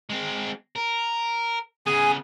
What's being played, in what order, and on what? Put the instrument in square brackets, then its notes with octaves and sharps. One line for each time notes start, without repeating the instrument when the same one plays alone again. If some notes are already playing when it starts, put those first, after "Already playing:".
[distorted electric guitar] G#3 C4
A#4
[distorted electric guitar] C#3 B3 [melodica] G#4 G#5